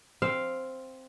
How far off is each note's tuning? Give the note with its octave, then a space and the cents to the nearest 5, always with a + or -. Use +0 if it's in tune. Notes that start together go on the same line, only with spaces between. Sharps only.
C4 +0 F5 +0